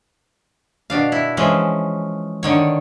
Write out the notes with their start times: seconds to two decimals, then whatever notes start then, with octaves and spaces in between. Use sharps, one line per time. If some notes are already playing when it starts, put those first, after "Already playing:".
0.90 B2 D4 F5
1.12 E4
1.37 E3 F3 G#3 C#4
2.43 D3 D#3 C#5